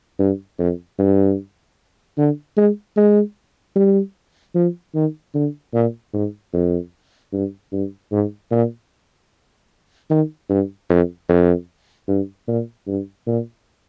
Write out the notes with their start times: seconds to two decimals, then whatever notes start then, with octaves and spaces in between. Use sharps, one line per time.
0.19 G2
0.59 F2
0.99 G2
2.18 D3
2.57 G#3
2.97 G#3
3.76 G3
4.55 F3
4.95 D#3
5.35 D3
5.74 A#2
6.14 G#2
6.54 F2
7.33 G2
7.72 G2
8.12 G#2
8.52 A#2
10.10 D#3
10.50 G2
10.90 F2
11.29 F2
12.08 G2
12.48 A#2
12.88 G2
13.27 A#2